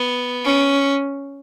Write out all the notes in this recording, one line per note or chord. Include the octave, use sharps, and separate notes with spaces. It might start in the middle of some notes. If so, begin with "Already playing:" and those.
Already playing: B3
C#4